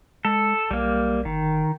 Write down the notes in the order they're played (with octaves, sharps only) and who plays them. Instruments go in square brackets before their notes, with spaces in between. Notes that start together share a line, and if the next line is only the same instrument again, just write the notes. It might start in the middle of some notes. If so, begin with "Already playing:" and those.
[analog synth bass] G#3 [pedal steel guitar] A4
[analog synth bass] B1 [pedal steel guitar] G3 A#3
[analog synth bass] G1 [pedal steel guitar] D#3